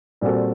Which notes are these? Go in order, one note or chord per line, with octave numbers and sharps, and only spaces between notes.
A#2 G3 C4 F#4 A4